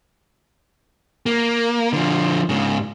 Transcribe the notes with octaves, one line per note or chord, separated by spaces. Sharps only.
A#3
D3 F3
G#2 C#3